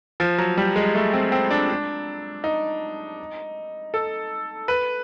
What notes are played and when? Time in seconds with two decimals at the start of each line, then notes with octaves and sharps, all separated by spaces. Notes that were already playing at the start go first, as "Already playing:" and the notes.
0.20 F3
0.38 F#3
0.58 G3
0.76 G#3
0.95 A3
1.13 C4
1.32 C4
1.51 D4
1.69 D4
2.44 D#4
3.94 A4
4.68 B4